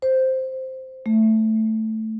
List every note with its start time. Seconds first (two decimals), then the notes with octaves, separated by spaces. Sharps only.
0.02 C5
1.06 A3